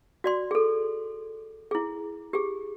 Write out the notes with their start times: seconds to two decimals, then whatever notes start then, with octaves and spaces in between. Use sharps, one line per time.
0.24 F#4 D5 C6
0.51 G#4 A4
1.71 E4 G#4
2.33 G4 G#4